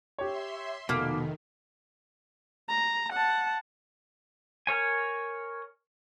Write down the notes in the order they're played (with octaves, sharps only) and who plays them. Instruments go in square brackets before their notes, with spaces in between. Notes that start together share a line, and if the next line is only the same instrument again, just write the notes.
[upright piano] G4 C#5 [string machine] E5 C6
[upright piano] F1 F6 B6 [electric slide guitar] B2 [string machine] D#3 [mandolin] A#3
[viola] A#5
F#5 A5
[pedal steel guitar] A#4 C#5 G#5